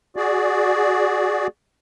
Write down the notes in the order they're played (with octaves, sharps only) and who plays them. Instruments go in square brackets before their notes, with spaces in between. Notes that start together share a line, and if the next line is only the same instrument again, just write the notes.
[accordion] F#4 G#4 D5